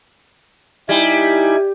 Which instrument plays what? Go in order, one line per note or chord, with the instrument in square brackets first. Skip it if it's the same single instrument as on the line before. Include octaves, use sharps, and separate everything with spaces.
[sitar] G3 [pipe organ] D#4 E4 G#5